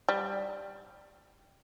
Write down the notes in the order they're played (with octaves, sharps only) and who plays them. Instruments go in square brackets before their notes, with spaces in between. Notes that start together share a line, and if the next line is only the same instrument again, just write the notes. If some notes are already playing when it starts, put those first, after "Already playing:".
[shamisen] G3